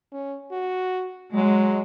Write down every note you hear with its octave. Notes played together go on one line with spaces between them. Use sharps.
C#4
F#4
F#3 G#3